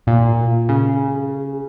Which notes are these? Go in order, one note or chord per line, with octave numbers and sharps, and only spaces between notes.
A#2
C#3